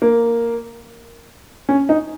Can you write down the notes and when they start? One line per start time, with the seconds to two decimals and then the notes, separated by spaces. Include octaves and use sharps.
0.02 A#3
1.69 C#4
1.89 D#4